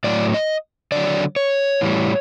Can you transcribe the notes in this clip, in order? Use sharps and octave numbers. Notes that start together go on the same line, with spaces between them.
A2 F#3 D5
D#5
D3 F#3 D5
C#5
A2 E3 G3